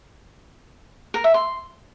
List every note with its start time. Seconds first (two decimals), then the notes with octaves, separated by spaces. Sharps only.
1.14 A#4
1.24 E5
1.34 C6